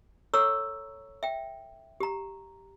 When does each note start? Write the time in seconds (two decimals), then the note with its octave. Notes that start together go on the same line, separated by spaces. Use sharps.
0.34 A4 C#5 A#5 C#6 E6
1.23 E5 G5
2.00 G4 A#5